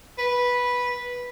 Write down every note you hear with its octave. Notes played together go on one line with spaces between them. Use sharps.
B4